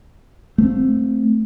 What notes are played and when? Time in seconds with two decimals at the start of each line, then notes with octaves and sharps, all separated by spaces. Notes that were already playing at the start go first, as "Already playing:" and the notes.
0.58 A3 B3 C4